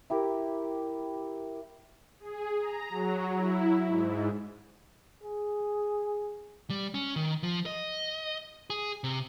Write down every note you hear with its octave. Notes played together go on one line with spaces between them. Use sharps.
E4 G4 A#4
G#4
A#5
F#3
E4
G#2
G#4
G3
C#4
D#3
F3
D#5
G#4
C3